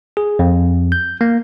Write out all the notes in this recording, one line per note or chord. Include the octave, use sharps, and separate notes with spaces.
G#4
F2
G6
A#3